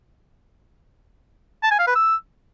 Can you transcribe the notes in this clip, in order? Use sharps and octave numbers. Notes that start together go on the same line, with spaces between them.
A5
G#5
F5
B4
E6